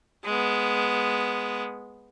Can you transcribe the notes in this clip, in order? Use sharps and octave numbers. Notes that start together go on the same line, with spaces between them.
G#3 B3